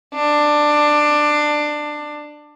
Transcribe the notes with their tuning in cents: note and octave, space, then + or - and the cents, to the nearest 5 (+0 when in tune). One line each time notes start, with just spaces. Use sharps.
D4 +15